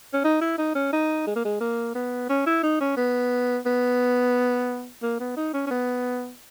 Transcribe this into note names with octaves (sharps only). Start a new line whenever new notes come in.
C#4
D#4
E4
D#4
C#4
D#4
G#3
A#3
G#3
A#3
B3
C#4
E4
D#4
C#4
B3
B3
A#3
B3
D#4
C#4
C#4
B3